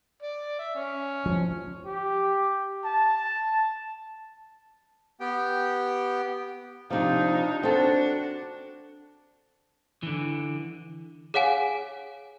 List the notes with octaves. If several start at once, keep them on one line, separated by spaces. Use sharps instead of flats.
D5
E5
C#4
F3
G4
A5
B3 G4 G5
C3 F3 D4 D#4
C4 D4 F#4 A4
D3 E3
G#4 C#5 F5 F#5 G#5